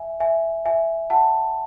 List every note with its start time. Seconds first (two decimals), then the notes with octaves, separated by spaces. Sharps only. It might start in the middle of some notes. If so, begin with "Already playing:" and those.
Already playing: E5 G#5
0.20 E5 G#5
0.66 E5 G#5
1.10 F#5 A5